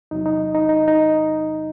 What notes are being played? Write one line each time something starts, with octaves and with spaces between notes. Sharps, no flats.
E2 C3 F#3 D#4
D#4
D#4
D#4
D#4